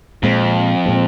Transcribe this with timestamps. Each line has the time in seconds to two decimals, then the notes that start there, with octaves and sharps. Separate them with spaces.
0.23 F2 A#2 G#3 C4
0.86 A#2 G#3 C4